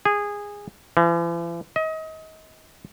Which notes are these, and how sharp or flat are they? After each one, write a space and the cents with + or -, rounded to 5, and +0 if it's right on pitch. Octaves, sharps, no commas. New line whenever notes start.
G#4 -15
E3 +45
D#5 +30